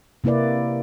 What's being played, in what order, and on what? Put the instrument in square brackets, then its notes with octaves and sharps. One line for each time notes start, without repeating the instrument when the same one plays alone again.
[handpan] C3 A#3 E4 B4 D5